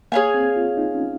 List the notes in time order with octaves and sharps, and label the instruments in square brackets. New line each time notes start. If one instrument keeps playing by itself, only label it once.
[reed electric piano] A#3 [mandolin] G#4 C#5 F5 G#5
[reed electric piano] C4
F4
D#4
C#4